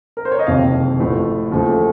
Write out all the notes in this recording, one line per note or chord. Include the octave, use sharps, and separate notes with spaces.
A#4
C5
C#5
D#5
F#1 F2 C3 D#3 F5
A1 A2 F3
D#2 C#3 F3 A3